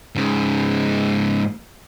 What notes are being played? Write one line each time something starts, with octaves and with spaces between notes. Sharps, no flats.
G#2 C#3